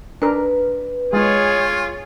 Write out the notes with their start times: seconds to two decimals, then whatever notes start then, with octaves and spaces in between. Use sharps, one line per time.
0.22 D4 A#4 B4
1.13 G#3 F4 G#4 C#5